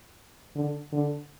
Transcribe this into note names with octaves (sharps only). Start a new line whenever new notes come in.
D3
D3